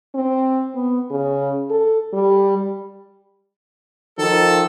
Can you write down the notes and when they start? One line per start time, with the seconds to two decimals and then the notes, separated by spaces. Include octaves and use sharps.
0.14 C4
0.75 B3
1.10 C#3
1.70 A4
2.13 G3
4.18 D#3 F3 A4